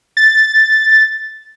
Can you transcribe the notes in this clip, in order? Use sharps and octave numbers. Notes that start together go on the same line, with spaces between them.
A6